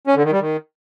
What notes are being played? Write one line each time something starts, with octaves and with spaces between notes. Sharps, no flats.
C#4
D3
D#3
G3
D#3